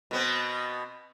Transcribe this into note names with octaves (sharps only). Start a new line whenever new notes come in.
B2 B3 C4